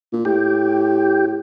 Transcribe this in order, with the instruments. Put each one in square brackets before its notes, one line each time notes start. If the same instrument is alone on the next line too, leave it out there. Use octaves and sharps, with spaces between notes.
[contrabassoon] A#2
[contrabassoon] A2 [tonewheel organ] G4